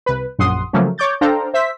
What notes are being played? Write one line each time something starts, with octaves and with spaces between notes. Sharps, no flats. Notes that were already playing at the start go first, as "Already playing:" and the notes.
C2 B4
A#1 F#2 F#5 C6 D#6
C#3 F3 F#3 A3 A#3 C#4
C#5 D6 G6 A6
D4 A4 C5 F5 G5 A#5
C5 E5 B6